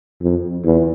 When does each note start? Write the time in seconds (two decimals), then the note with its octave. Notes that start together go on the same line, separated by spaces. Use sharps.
0.21 F2
0.64 E2